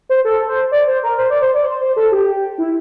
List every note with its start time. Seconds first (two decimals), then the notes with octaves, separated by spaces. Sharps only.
0.09 C5
0.25 A4
0.48 C5
0.72 D5
0.87 C5
1.03 A#4
1.18 C5
1.30 D5
1.42 C5
1.54 D5
1.65 C5
1.81 C5
1.96 A4
2.12 G4
2.58 E4